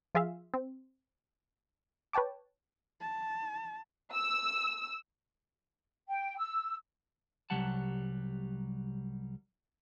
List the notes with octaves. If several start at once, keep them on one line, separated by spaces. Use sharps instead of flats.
F3 F4 G#4 E5 F5
C4
B4 C#5 G5 A5 D6
A5
E6
G5
E6
C2 C3 F#3 G3 F#5 A5